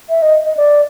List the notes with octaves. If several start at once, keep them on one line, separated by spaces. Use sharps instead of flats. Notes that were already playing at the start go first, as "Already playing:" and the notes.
E5
D#5
D#5
D5